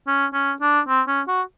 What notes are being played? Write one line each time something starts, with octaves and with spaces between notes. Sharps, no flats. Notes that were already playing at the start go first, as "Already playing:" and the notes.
C#4
C#4
D4
C4
C#4
F#4